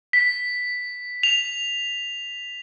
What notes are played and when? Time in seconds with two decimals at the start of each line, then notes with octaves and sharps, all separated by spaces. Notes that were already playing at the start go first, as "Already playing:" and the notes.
0.13 B6
1.23 F7